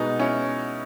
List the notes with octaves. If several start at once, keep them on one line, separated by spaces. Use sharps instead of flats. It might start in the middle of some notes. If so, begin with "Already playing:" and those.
Already playing: B2 G#3 B3 D#4
C#4 E4